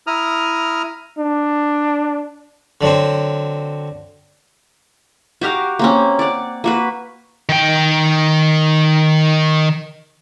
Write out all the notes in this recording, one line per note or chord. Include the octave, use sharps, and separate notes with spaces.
E4 A#5 D#6 F6
D4
D3 F#3 C4
F#4 G4 A#4 F5
A#3 C4 C#4
D5 F#5
A#3 F#4 B4
D#3 G5